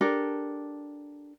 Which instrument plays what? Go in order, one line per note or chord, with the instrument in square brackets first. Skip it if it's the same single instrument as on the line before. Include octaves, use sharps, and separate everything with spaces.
[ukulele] D4 G4 A4 A#4